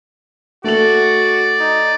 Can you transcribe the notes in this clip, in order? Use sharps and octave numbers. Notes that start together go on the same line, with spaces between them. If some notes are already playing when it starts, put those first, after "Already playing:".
A3 F#4 D5 F#7
D#4